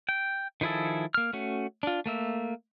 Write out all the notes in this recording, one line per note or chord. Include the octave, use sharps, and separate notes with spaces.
G5
D#3 F3 E4 G#4 A4
A#3 F6
A3 C#4 F#4
D4 F4
A3 A#3 E5